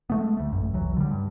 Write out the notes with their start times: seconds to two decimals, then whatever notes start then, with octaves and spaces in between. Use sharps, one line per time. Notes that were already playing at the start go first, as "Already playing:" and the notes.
0.10 G#3 A3 B3
0.37 D2 A3
0.52 A1 F#2
0.73 E1 C2 E3 F#3
0.97 D3 G3
1.11 G2